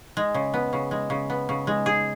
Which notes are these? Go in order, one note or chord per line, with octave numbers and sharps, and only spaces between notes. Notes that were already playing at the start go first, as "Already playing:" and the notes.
G#3
C#3
B3
C#3
G#3
C#3
B3
C#3
G#3
G#4